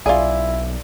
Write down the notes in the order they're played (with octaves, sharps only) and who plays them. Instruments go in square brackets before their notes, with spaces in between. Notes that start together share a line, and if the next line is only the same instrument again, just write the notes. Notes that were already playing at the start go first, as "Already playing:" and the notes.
[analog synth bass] B1 [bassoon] E4 [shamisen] F4 G#4 [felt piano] D5